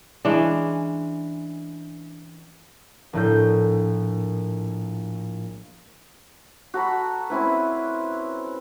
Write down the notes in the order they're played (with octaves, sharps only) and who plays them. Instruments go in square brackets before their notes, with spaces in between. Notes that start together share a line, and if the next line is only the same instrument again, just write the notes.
[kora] E3 G#3 C#4 D4
[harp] A#1 A2 G6
[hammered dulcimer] F#4 A4 A#5 B5
C4 C#4 E4 B4